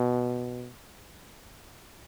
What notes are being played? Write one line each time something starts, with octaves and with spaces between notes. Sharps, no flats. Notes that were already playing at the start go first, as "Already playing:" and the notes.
Already playing: B2